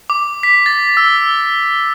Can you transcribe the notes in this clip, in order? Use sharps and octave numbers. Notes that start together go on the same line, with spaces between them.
D6
B6
A6
E6